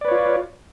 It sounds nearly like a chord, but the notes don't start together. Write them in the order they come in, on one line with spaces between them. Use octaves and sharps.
D5 B4 C#5 F4